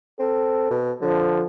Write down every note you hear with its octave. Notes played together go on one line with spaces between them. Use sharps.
C4 A4
B2
D3 F3